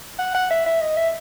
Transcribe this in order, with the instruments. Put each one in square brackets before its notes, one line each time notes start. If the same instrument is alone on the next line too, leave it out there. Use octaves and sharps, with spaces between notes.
[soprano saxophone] F#5
F#5
E5
E5
D#5
E5